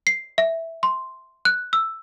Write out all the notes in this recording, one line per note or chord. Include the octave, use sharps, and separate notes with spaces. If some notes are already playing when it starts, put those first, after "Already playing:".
C7
E5
C6
F#6
E6